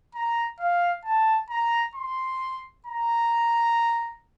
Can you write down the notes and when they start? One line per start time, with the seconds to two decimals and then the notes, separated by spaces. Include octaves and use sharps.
0.15 A#5
0.60 F5
1.04 A5
1.50 A#5
1.95 C6
2.86 A#5